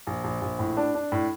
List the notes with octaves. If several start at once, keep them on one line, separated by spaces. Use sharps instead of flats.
A#1
A#1
A#1
A2
D4
D4
A2